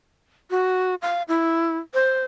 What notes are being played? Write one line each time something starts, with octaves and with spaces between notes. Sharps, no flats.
F#4
F5
E4
C5